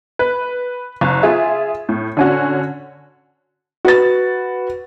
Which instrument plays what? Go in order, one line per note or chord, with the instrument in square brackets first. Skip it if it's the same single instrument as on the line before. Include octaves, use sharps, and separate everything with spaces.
[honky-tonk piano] B4
F#1
F4 G#4 E5
A2
D3 C#4 F#4
[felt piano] F#4 B4 A6